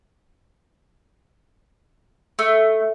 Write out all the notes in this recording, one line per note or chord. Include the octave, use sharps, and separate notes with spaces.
A3